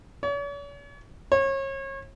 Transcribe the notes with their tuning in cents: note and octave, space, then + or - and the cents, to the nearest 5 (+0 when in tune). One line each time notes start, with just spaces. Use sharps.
C#5 +45
C#5 -30